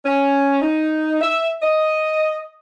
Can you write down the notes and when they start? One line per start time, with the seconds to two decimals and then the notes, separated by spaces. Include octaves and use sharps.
0.06 C#4
0.62 D#4
1.21 E5
1.63 D#5